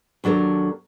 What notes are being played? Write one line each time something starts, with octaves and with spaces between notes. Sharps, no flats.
D#2 F#3 D4 A4 A#4